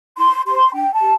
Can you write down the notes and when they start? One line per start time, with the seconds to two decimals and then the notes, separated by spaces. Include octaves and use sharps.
0.18 E4 C6
0.46 G4 C5 C6
0.73 D4 G5
0.93 A5
1.01 G4